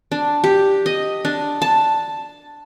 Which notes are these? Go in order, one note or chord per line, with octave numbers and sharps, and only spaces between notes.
D4
G4
D#5
D4
A5